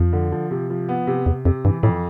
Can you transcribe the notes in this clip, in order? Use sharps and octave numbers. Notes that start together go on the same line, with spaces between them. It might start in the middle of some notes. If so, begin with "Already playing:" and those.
Already playing: F2 F3
D3
F3
C3
F3
B3
C3
E2 C3
F2 C3
G2 E3
F2 A2